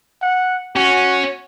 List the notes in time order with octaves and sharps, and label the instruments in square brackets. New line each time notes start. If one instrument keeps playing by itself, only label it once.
[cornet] F#5
[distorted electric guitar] C#4 [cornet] F#4